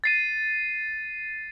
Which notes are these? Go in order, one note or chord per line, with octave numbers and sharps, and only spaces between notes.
A6 C7 D#7